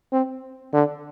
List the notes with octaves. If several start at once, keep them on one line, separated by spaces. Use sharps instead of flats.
C4
D3